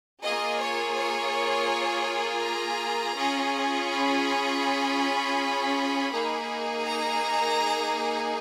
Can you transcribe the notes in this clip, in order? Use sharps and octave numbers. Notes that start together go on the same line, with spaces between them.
A#3 F4 G#4 D#5
C#5
C#5
A#5
C#4 F4 G#4
B5
A#3 D#4 G#4
A#5